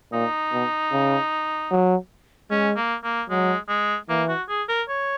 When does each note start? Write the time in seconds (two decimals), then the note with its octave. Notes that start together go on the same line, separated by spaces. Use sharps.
0.12 A#2 D#4
0.52 B2
0.92 C#3
1.71 F#3
2.50 G#3 C#4
2.76 A#3
3.04 A#3
3.29 F#3 G#3
3.69 G#3
4.09 E3 A#3
4.28 F#4
4.49 G#4
4.68 A#4
4.89 C#5